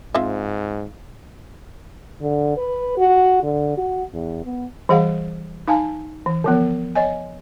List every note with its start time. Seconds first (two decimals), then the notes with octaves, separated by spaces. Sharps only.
0.15 G#2 C4 F4 E5
2.21 D3
2.57 B4
2.97 F#4
3.43 D3
3.77 F#4
4.13 E2
4.45 B3
4.89 E3 G3 G#4 F5 F#5
5.68 D#4 F5 G#5 A5
6.26 E3
6.44 D3 F3 B3
6.95 C#5 D#5 G#5